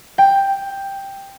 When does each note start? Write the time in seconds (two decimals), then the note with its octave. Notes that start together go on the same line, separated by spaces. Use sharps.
0.18 G5